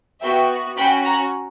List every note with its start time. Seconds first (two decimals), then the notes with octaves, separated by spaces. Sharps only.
0.22 B3 F#4 E5 G5
0.78 C#4 F#4 G5 B5
1.05 F#5 A#5